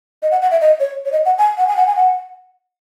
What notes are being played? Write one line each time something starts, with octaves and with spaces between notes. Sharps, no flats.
D#5
F#5
F#5
E5
D#5
C#5
C#5
D#5
F#5
G#5
F#5
G#5
F#5
G#5
F#5